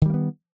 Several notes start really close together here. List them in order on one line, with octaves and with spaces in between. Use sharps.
D#3 G3 A#3 B3